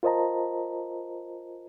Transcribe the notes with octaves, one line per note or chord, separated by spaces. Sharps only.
F4 A#4 C5 D#5 A5 A#5